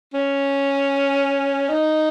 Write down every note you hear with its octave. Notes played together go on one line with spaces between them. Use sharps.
C#4
D#4